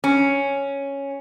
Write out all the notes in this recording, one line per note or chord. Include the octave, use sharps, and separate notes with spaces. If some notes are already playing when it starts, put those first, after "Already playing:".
C#4